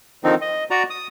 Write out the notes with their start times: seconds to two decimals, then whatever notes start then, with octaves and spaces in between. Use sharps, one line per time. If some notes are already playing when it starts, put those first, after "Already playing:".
0.24 D3 D#3 F3 C4 D#4
0.41 D#5
0.71 F#4 D5 A#5
0.90 D#6